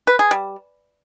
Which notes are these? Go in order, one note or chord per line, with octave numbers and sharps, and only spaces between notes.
B4
G#4
G3